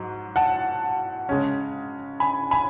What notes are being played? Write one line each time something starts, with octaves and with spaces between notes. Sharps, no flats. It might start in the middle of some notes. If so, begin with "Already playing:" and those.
Already playing: G#2 F#3
F#5 A5
C#3 G#3 C#4
G#5 B5
G#5 B5